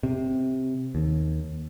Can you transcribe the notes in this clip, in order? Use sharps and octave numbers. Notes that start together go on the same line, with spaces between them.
C3
D#2